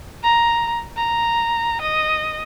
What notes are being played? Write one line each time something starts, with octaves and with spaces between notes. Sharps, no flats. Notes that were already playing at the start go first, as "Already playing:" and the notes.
A#5
A#5
D#5